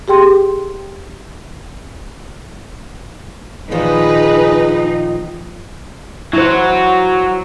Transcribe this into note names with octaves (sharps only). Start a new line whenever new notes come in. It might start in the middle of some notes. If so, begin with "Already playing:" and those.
G4 G#4 G5 C6
A#2 D#3 F3 D#4 G#4 B4
F#3 E4 F#4 C5